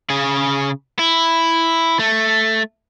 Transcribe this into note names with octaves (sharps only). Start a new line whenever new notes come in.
C#3 G#4
E4
A3